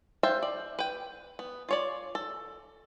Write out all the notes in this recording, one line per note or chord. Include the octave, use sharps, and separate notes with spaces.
C5 E5 F5 G5 A5
D5
B4 G5
B3
F4 C#5 D5
A4